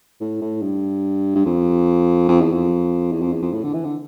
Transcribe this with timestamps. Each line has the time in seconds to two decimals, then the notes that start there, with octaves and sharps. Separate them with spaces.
0.20 A2
0.41 A2
0.62 G2
1.35 G2
1.46 F2
2.29 F2
2.41 E2
2.53 F2
3.12 E2
3.22 F2
3.33 E2
3.42 F2
3.52 A2
3.64 D3
3.74 E3
3.84 D3